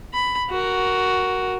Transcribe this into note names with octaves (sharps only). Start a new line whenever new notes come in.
B5
F#4 A#4